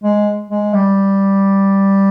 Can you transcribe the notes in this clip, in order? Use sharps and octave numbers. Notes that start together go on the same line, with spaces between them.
G#3
G#3
G3